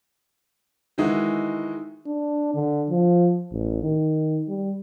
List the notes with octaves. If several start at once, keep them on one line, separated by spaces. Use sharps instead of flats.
D#3 E3 G#3 D#4 E4 F#4
D4
D3
F3
A1
D#3
G3